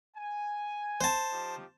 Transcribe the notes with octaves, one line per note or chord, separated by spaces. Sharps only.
G#5
C5 A5
F3 D#4 G4